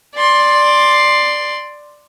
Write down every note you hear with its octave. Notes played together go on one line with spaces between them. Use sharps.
D5 C6